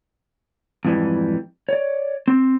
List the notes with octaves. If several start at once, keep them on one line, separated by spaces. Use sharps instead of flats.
F2 G#2 E3 G3
C#5 D5
C4